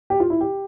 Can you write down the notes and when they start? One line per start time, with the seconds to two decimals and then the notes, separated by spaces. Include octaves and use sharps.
0.10 G4
0.20 F4
0.30 E4
0.41 G4